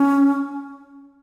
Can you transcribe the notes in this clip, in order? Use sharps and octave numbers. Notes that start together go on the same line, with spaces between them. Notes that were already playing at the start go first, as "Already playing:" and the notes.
Already playing: C#4